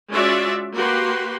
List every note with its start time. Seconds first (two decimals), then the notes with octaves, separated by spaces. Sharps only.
0.11 G#3 C#4 F4 F#4 D5 E5
0.74 A#3 F#4 G4 B4 C6